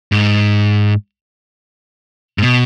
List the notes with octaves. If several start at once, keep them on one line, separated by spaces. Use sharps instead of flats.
G#2
G#2
B2